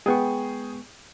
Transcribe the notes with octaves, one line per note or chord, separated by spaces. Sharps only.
G#3 B3 G#4 G5 C#6